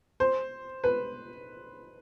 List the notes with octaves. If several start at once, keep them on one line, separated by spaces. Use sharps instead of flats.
C5
B4